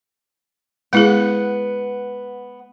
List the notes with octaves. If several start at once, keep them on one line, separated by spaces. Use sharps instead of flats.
G#3 B3 E4 G#4 F#5